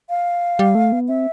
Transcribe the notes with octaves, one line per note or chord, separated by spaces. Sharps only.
F5
G3
A3
B3
C4 E5